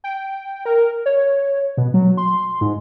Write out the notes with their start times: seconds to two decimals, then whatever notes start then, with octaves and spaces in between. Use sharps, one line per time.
0.04 G5
0.65 A#4
1.06 C#5
1.77 B2
1.94 F#3
2.17 C6
2.61 G#2